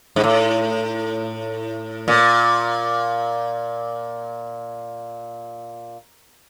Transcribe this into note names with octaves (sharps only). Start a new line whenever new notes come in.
G#2
A2
A#2